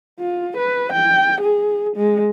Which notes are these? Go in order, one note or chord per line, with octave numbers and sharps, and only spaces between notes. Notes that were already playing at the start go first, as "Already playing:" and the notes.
F4
B4
G5
G#4
G#3